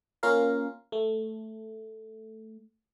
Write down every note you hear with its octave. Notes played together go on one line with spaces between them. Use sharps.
A#3 C#4 F4 A#4 F5
A3